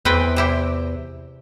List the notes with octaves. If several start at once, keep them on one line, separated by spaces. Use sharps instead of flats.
E2 C4 B4 G5
C3 E4 G4